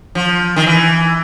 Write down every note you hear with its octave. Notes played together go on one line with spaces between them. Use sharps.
F3
D#3
E3